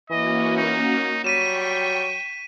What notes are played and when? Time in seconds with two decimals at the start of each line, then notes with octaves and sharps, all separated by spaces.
0.10 E3 A#3 C#4 F#4 D#5
0.57 D#4
1.24 F#3 G3 G5 C#6 B6 D#7 E7